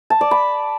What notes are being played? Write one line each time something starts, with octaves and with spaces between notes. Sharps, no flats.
A5
D5
B5